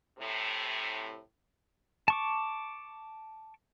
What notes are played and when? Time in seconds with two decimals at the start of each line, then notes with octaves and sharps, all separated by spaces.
0.18 A2 C3
2.08 A5 C#6 D6